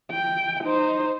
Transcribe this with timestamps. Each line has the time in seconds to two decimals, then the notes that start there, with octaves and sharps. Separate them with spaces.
0.12 G5
0.64 D#4 C5